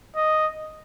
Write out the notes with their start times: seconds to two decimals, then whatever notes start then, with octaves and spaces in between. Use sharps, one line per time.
0.16 D#5